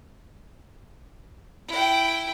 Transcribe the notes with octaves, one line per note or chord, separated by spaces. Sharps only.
E4 G5